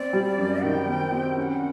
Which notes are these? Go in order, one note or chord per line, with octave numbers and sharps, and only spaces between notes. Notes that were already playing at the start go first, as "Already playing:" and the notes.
Already playing: C4 D5
G3
F#2
D#3 G5
C4
C4
C#4 F#5 G5